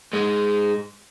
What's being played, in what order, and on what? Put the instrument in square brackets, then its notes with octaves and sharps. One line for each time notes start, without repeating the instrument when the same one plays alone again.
[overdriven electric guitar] G#2 G#3